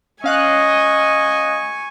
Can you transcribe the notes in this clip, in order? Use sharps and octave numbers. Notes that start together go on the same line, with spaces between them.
C#4 D#5 F5 G#5 C#6 F#6